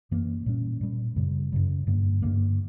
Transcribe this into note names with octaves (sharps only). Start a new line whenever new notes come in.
F#2 E3 A#3
A#2 G3 C#4
A#2 G3 C#4
F#2 C#3 G3
F#2 C#3 G3
G2 D3 A#3
G2 D3 A#3